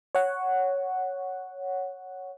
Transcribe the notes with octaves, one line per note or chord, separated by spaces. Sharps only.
C#5 F#5